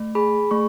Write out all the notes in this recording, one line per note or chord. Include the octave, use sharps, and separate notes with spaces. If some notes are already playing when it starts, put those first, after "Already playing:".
Already playing: A3
G#4 B5
A3 C#6